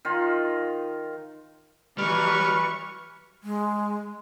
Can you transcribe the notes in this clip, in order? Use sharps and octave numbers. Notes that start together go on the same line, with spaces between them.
D#3 F4
E3 F#3 G3 B4 C#6 F6
G#3